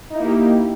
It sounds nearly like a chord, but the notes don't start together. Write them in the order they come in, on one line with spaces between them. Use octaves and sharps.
D#4 E4 A#3 G4